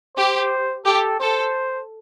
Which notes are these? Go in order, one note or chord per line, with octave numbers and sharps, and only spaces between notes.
G4 C5
G4 A4
A4 C5